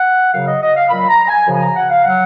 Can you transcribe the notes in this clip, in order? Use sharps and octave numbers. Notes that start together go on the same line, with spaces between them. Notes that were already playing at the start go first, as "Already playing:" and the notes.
Already playing: F#5
F#2 C#3 F#3 F5
D#5
D#5
F5
A#2 F#3 B5
A#5
G#5
F#2 C#3 F3
G#5
A#5
F#5
F5
F#3 F#5